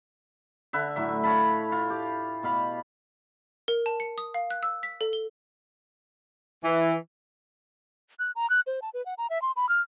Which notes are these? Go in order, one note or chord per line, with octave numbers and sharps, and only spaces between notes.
D3 B4 E5
A2 F#3 E5
C#5 F5 A5 B5
F4
G4
B2 F5 B5
A#4
A5
C#7
D#6
F5
F#6
E6
B6
A4
G7
E3
F#6
A#5
F#6
C5
A5
B4
F#5
A#5
E5
C6
B5
F6